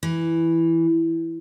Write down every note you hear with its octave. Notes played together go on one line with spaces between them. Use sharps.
E3